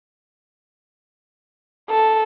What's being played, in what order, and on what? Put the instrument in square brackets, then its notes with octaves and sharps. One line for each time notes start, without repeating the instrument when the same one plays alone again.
[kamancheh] A4